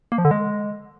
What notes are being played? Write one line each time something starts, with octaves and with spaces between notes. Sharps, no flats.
A#3
F3
D3
G#3